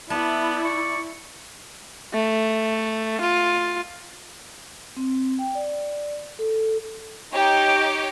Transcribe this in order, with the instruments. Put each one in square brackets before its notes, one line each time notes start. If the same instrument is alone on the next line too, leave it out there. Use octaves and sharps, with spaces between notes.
[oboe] B3 [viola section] E4 [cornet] D5 [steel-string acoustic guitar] A5
[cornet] D5 [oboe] C#6
[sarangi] A3
F4
[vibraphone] C4
G5
D5
A4
[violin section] D#4 G4 C#5 [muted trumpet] G5